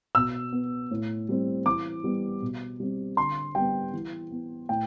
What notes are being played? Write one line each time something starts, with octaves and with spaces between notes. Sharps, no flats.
B2 E6
B3
A2
G3 C4
E3 D6
G3 B3
B2
G3 C4
D3 C6
G3 B3 G5
E3
B3
A2 G5